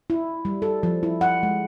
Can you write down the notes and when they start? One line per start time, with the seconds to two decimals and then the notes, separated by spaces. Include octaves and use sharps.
0.10 E4
0.45 G3
0.62 A4
0.83 F3
1.03 E4
1.21 F#5
1.43 G#3